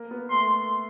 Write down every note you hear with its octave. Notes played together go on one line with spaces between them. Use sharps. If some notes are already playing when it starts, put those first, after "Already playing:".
Already playing: A#3
B3
A3 C6